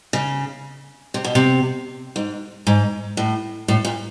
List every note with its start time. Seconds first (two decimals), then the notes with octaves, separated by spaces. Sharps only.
0.13 C#3
1.14 C3
1.24 B2
1.35 C3
2.16 G#2
2.67 G#2
3.17 A2
3.68 A2
3.85 A#2